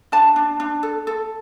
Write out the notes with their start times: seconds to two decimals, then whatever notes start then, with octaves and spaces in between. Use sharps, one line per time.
0.12 D4 A5
0.36 D4
0.60 D4
0.83 A4
1.07 A4